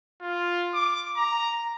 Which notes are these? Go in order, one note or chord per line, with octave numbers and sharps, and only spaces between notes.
F4
D6
A#5